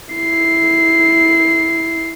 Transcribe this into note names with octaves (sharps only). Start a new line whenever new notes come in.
E4 C7